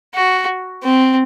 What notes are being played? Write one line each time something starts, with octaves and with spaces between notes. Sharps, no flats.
F#4
C4